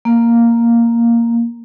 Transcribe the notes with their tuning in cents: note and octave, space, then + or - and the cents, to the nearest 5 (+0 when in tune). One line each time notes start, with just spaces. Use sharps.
A#3 +0